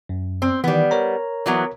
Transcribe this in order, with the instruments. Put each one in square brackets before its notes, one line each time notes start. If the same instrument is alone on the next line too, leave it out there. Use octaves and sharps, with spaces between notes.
[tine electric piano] F#2
[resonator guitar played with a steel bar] C4
[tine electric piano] D#3 E3 [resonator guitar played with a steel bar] G3 B3
[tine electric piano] A#4 C#5 A#5
[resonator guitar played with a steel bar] E3 F#3 B3